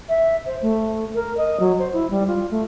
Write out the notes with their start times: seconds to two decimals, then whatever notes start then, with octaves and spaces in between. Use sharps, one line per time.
0.09 E5
0.46 C5
0.62 A3
1.15 A#4
1.37 D#5
1.60 F#3
1.79 C5
1.93 E4
2.11 G3
2.28 F4
2.51 A3